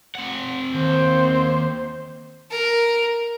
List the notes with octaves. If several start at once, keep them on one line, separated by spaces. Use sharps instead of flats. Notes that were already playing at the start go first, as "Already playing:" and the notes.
C4 F#5
D#2 C5
A#4